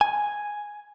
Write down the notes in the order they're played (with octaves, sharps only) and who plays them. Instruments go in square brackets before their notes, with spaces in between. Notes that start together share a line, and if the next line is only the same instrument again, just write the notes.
[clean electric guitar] G#5